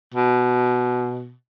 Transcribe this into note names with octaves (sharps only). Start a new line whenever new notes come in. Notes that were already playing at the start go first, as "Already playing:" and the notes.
B2